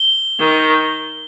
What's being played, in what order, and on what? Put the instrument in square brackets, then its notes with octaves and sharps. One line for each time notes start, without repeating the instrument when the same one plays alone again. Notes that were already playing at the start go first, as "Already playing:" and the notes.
Already playing: [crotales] G7
[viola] D#3